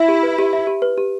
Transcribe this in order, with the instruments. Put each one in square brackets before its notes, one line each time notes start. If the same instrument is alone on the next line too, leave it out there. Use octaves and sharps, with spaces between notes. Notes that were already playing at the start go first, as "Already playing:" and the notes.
Already playing: [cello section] E4 [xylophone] E5
[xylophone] G4
B4
G4
E5
G4
B4
G4